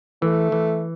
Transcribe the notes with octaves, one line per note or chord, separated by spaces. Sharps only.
E3 A3
E3